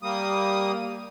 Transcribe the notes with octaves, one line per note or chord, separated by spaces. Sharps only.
G3 A#3 D#6